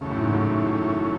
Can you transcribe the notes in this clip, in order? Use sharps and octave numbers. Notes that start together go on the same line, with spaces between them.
F#2 C#3 E3 A3 C#4
A2
G#2
A2